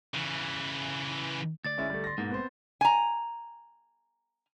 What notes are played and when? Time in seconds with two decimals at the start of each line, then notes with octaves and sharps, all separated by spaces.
0.14 C#3 E3
1.65 D2 D5 A6
1.78 G#3 C#4 E4
1.90 G3 A3
2.04 C6 A#6
2.18 G#2 B2 G#3 A#3
2.30 B3 C4 C5
2.81 G#5 A#5